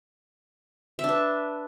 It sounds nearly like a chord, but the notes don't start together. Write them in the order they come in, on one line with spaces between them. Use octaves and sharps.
E5 D4 B4